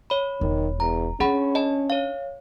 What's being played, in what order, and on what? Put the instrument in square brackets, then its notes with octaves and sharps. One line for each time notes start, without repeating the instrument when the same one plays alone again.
[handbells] C#5 B5
[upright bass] E1 [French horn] D#3
[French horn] E2 [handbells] A#5
[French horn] C#4 [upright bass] D4 [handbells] G#4 F#5 B5
[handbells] D#5 A5
C#5 F5